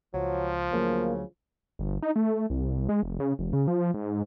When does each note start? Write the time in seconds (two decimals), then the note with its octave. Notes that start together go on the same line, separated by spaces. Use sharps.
0.14 C#2 F3 F#3
0.73 D2 C#3 F#3 A#3
1.79 G1
2.02 D#4
2.16 A3
2.50 C2
2.89 G#3
3.03 F1
3.20 C#3
3.39 F1
3.53 C#3
3.67 F3
3.94 G#2